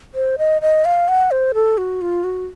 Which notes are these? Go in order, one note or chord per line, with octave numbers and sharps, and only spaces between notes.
C5
D#5
D#5
F5
F#5
C5
A4
F#4
F4
F#4